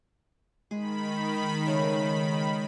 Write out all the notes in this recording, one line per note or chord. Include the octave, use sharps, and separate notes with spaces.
D#3 G#3 G#4 B5
C#3 A3 A4